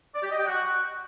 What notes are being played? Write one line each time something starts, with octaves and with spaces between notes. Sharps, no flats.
D5
G4
D#5
G5
F#4